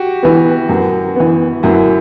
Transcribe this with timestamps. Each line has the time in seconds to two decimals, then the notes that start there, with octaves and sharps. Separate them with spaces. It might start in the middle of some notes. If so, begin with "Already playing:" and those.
Already playing: F#4 G4
0.23 E3 B3
0.69 F#2
1.16 E3 B3
1.63 F#2 E4